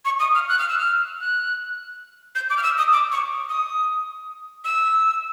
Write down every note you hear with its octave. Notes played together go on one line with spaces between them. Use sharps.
C#6
D#6
F6
F#6
F6
E6
F6
F#6
G6
D6
F6
E6
D#6
D6
C#6
D#6
E6